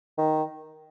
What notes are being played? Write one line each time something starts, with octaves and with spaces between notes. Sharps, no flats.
D#3